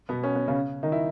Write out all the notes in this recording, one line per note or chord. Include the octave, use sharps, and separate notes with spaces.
B2 B3
C#4
B3
C#3 C#4
D#3 D#4
E4